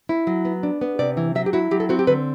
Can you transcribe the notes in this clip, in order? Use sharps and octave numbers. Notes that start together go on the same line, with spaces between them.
E4
F#3
B3
D4
B3
C3 D5
E3
F#3 E5
G4
E4 F#4
F#3 G4
A4
C4 F#4
G4
D3 B4